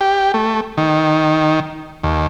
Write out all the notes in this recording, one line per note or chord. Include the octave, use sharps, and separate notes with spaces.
G4
A3
D#3
D#2